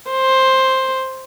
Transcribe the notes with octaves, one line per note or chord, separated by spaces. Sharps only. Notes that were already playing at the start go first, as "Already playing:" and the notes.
C5